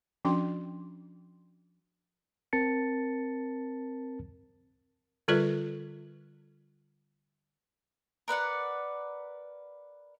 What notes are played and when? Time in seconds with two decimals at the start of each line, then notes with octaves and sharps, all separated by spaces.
0.25 F3 C#4 D4 F#4 G5 C6
2.53 C4 A#4 A5 A6 C#7
5.28 D3 G3 F4 A4 B4 D5
8.28 A#4 B4 D5 F#5